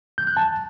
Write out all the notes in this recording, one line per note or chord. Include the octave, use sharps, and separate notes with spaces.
G6
F#6
A5